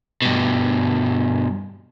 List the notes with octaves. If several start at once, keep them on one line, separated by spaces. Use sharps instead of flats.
G2 B2